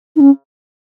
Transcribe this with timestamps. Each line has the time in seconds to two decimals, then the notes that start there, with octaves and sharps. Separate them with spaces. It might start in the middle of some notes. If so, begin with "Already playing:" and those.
0.16 D#4
0.20 C#4